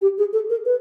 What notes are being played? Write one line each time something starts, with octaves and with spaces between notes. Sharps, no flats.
G4
G#4
A4
A#4
B4